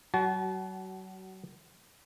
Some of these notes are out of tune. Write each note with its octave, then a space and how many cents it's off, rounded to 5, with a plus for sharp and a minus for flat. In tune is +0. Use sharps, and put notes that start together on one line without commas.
F#3 +35 F#4 +20 A5 -30